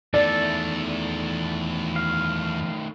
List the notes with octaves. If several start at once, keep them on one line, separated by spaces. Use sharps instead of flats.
E2 D#3 A3 A4 D5
F5